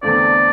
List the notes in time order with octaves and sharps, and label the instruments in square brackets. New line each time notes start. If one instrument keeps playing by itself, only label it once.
[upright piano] E2 D3 A3 C4 [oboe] D5